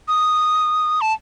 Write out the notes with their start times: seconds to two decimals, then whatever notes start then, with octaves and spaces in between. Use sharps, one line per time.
0.08 D#6
1.01 A5